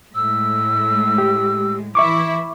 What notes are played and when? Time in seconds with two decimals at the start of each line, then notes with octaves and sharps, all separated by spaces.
0.15 A2 G#3 E6
1.18 G4
1.95 E3 E4 E5 C#6 D6